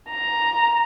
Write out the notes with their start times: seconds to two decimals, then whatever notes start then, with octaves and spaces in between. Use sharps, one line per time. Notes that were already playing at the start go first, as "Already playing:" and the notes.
0.11 A#5